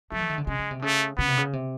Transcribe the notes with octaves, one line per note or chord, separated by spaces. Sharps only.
F#3 A3
E3
D#3
D3
C#3 G#3
C#3
C3
C#3 A3
C#3 B3
C3
C#3
C3